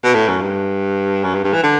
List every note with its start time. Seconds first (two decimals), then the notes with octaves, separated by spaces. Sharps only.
0.04 B2
0.14 A2
0.28 F#2
0.41 G2
1.24 F#2
1.34 G2
1.44 G2
1.54 E3
1.63 D3